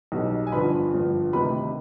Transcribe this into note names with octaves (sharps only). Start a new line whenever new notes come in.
B1 B2 G3
G#5
G1 G2 F3 B4 B5
G1 G2 F3
D2 C3 D#3 G3 B4 B5